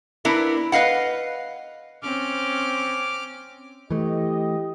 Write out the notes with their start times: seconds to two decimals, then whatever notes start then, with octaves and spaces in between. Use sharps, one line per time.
0.25 B3 D4 E4 A#4
0.72 B4 D#5 F5 F#5
2.03 C4 C#4 D6 F6
3.91 E3 A3 G4 D#5